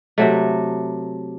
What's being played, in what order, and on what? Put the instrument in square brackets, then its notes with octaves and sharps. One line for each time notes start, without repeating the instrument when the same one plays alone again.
[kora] C3 F#3 A3